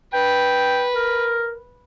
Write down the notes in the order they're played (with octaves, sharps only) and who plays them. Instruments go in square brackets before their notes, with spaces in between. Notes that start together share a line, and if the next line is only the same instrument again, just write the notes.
[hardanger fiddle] B4 [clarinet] G5
[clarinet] A#4